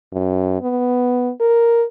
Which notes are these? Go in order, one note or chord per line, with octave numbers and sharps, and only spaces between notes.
F#2
B3
A#4